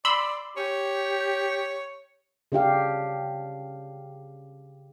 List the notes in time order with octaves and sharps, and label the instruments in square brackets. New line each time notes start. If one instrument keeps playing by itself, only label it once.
[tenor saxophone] D5 [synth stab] B5 C6 E6
[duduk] G4 [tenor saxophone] C#5
[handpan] C#3 D4 G4 F5